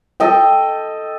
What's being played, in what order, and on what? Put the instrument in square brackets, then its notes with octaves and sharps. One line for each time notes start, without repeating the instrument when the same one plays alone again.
[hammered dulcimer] A4 D#5 G5